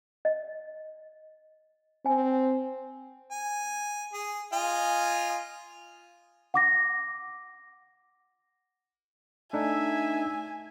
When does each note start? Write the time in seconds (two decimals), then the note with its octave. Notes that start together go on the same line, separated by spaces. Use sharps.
0.25 D#5
2.06 C4 G#5
3.31 G#5
4.13 G#4
4.53 F4 D#5 G#5
6.54 F#5 D6 A#6
9.53 A3 D4 D#4 E5 G#5